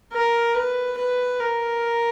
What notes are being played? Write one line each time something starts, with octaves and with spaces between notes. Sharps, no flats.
A#4
B4
B4
A#4